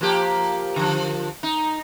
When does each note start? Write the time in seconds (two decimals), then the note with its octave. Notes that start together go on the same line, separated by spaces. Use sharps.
0.01 F3 A#3 G4
0.76 D3 F3
1.43 D#4